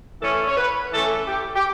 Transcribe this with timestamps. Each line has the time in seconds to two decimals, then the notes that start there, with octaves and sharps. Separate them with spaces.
0.21 E3 A3 C#4 A4
0.47 C#5
0.57 B4
0.92 E3 A3 C#4 A4
1.28 G4
1.55 G4